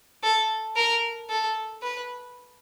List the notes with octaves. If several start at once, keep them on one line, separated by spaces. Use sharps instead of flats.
A4
A#4
A4
B4